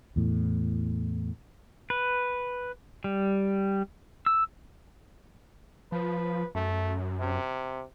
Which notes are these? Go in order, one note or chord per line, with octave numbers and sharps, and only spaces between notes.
E2 A2
B4
G3
E6
F3 B4
F#2 A3
C3